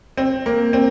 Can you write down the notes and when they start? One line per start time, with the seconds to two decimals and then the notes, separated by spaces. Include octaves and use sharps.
0.17 C4
0.46 A#3
0.73 C4